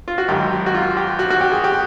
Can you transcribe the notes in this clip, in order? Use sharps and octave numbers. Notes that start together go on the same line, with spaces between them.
F4
F#4
G#1 F#2 D#3 G4
F#4
F4
G4
F#4
F#4
G4
G#4
G4